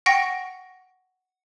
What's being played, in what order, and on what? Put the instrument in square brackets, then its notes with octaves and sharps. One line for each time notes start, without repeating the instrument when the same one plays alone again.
[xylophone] F#5 G5 C#6 A#6 D7